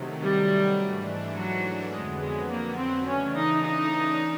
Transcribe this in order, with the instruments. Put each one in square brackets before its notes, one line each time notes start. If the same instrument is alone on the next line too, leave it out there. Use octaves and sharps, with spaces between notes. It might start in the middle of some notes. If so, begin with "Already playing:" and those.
Already playing: [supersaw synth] C3 D#3 F#3 A3
[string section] G3
[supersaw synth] G#2 E3 A3 D4
[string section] F#3
[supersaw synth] F2 D3 F#3 B3 [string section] G#3
[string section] G#3
A#3
C4
[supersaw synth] C#3 E3 A3 D4 [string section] C#4
[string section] D#4
D#4